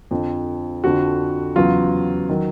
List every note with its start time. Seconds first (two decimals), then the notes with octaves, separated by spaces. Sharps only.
0.11 F2 D3 F3
0.84 F2 D3 F3 F#4
1.56 E2 C#3 F#3 F4
2.29 D#3 F#3